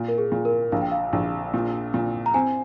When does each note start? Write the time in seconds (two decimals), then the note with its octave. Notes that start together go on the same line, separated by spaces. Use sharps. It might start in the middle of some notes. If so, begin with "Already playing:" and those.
Already playing: A#2
0.08 A#4
0.18 G#4
0.32 A#2
0.45 A#4
0.72 A#1 F5
0.82 G5
0.92 F5
1.13 A#1
1.54 A#2
1.94 A#2
2.26 A#5
2.34 C4 G#5